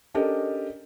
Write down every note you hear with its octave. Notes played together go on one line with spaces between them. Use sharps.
C#4 D4 G4 A4 A#4 D#5